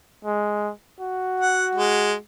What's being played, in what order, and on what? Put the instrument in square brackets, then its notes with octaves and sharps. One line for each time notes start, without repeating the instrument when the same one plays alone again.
[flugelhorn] G#3
F#4
[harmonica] F#5
G#3